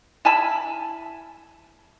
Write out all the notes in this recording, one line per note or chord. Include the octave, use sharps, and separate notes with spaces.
E4 G#5 A5 B5